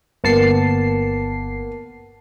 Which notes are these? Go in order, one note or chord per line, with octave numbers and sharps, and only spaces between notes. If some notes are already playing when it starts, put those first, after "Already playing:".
G1 A#3 B3 A5 C7 C#7